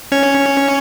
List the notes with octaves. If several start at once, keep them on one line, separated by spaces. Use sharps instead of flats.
C#4 C#5